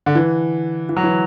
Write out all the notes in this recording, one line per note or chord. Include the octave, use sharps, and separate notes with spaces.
D3
E3
E3
F#3
E3